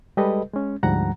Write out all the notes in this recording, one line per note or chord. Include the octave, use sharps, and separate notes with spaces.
G3 G#3 G4 A4 B4 D#5
G#3 C#4
D2 G#2 F3 G3 F#5 A#5